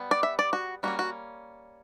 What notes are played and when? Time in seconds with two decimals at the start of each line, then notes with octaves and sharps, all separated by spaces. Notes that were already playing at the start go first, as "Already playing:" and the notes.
Already playing: G3 B3
0.11 D5
0.23 E5
0.39 D5
0.53 F#4
0.83 G3 A#3 C#4 F#4
0.99 F#4